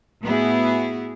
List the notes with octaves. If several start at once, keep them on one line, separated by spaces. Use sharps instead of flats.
A2 B3 E4 F#4 G#4